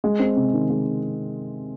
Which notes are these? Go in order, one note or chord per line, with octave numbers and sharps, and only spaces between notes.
G#3
C4
C3
D#3
G#3